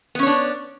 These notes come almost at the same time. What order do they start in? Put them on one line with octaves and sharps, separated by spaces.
B3 C#4 C#5 D4